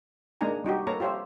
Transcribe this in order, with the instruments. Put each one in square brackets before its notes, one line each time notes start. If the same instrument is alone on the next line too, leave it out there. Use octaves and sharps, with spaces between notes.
[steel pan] G#3 A#3 D4 D#4 G#5 A#5
G3 D#4 F#4 G4
A#3 A4 B4 C#5 A#5 B5
F4 G4 C5 C#5 E5